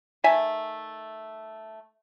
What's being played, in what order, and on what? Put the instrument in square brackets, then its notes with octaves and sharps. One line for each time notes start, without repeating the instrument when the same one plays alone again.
[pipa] D#3 A3 E5 G#5